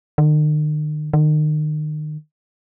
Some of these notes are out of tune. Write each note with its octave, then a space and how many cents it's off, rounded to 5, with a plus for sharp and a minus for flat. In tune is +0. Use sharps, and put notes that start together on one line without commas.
D#3 -45
D#3 -35